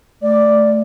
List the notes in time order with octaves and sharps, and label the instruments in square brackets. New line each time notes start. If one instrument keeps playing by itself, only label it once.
[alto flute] A3 [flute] D5